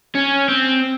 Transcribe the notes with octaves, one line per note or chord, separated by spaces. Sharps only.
C#4
C4